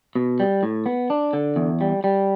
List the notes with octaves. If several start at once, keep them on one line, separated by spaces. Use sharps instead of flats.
B2
G3
A2
B3
D4
D3
E2
G3
G3